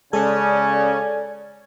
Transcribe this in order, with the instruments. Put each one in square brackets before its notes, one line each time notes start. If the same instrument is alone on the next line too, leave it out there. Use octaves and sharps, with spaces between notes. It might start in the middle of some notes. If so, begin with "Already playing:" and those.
[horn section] C#3 C#4 [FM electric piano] G#3 A4 [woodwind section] D5 [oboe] G#5